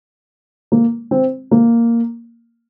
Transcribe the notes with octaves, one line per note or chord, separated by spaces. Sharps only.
A#3
C4
A#3